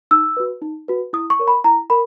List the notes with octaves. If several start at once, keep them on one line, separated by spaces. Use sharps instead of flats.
D#4 E6
F#4 B4
D#4
F#4 B4
E4 D#6
C#6
A#4 C#5
B5
E4 A#5
A#4 B5